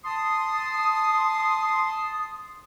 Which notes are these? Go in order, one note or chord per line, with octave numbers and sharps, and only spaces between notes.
A5 C6 D#6